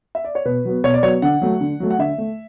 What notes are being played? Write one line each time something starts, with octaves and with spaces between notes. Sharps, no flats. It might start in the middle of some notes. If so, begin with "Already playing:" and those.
E5
D5
C#5
B2 B4
F#3 B3
B2 C#5
D5
F#3 B3 C#5
D3 F#5
F#3 A3
D3
F#3 A3
F#5
D3 E5
A3